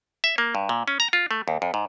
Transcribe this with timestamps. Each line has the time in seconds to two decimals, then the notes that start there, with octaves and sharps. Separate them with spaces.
0.24 E5
0.38 A#3
0.55 G2
0.69 A#2
0.88 C#4
1.00 A#5
1.13 F4
1.31 A3
1.48 D#2
1.62 F2
1.74 G#2